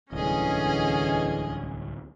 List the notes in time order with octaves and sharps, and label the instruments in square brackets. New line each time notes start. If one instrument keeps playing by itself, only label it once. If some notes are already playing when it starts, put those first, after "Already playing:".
[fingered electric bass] D1 C2 [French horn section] D3 E3 G#3 [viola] C#4 [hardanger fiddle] G#4 D#5